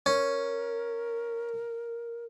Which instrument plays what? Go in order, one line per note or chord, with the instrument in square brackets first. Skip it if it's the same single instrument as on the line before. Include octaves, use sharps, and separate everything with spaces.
[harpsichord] C#4 [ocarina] A#4